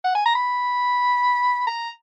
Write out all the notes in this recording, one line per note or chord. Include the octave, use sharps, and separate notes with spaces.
F#5
G#5
A#5
B5
A#5